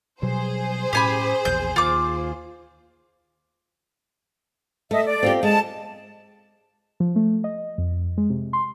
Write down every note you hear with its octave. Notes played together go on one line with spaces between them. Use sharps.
B2 F#3 G3 G#4 C5
A2 C#4 G4 G#5 B5
E1 A#1 E2 G6
D#2 F4 D6
A3 D#5 E5
D5
C4 F4 G4
G#3 A5
F3
A3
D#5
F2
G#3
C3
C6